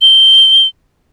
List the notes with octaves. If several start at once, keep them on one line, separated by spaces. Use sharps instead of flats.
G7